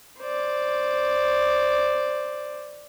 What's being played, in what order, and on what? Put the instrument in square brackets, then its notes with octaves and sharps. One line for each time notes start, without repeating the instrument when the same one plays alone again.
[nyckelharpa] C5 D5